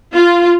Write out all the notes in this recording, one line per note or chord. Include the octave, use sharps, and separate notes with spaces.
F4